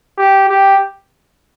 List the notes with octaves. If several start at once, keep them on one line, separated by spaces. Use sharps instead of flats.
G4
G4